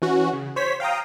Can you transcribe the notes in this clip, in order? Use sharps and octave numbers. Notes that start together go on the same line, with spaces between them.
E3 C#4 F#4
C#3
C5 C#5 B6
F5 G5 A#5 D#6